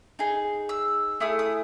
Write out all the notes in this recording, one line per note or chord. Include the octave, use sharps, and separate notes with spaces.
D#4 G#4
E6
A3 E4 G#4 D#6
D#6